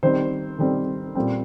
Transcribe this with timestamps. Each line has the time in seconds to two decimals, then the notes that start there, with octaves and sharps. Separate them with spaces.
0.03 D#3 G3 C4 C5
0.59 D#3 G3 C4
1.15 A#2 G3 C4